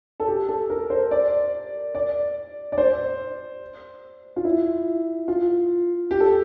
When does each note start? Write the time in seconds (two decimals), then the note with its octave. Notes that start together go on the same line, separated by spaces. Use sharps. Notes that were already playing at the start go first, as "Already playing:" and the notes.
0.20 A4
0.27 G4
0.49 A4
0.70 A#4
0.90 C5
1.11 D5
1.95 D5
2.72 D5
2.78 C5
4.36 F4
4.45 E4
5.28 F4
6.11 G4
6.20 A4